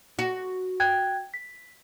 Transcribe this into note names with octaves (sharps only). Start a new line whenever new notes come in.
F#4
G5 F#6 G#6
B6